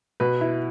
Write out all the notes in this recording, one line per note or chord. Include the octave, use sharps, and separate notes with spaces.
B2 B4
E4